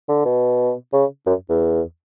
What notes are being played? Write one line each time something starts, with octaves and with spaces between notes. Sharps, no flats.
D3
B2
C#3
F#2
E2